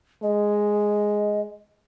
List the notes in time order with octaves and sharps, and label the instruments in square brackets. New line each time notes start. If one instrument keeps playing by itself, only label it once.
[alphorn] G#3 [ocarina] D#5